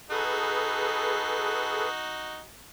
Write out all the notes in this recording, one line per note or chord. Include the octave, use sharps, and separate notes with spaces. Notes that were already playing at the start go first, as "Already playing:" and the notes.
D#4 F#4 G#4 A4 B4